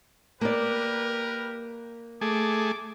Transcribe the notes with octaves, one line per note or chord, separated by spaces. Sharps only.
A#3 G4 A#4 B4 D5
A3 G#4 D6